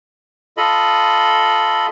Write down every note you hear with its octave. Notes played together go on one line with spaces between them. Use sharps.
F4 A4 D#5 B5